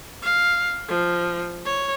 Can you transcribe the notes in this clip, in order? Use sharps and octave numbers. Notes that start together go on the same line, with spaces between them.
F5
F3
C#5